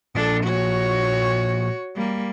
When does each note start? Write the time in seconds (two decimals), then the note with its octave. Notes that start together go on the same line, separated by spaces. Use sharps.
0.15 A#2 F3 D4 A4
0.44 F#4 C#5
1.96 G3 A#3